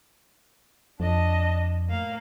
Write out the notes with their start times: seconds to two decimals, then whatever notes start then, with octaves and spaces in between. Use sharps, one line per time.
1.00 F2 D4 D#5 A5
1.89 A2 A#3 F5